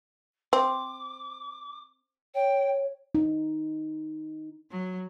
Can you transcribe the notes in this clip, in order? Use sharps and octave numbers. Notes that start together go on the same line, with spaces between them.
C4 D6
C#5 G5
D#4
F#3